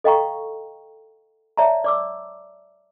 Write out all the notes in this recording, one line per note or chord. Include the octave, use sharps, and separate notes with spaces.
A4 D#5 F5 G5 A#5 C#6
C#5 D5 E5 A5 A#5
D5 D6 E6